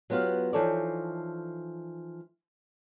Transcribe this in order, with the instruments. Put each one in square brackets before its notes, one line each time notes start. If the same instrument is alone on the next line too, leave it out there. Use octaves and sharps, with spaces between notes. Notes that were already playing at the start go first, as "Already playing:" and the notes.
[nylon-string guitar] F#3 B3 F4 G4 F5
E3 F3 D#4 A4 C#5 D5